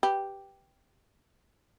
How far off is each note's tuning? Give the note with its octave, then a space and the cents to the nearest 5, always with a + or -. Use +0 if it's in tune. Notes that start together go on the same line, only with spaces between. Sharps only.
G4 +0 B4 +0